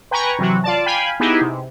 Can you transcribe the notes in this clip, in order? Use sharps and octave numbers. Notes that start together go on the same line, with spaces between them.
B4 G5 G#5 A#5 B5 C#6
C3 E3 F#3 F#4
F4 D5 A5
F5 G5 G#5 B5
B3 D#4 E4 G4 G#4
C3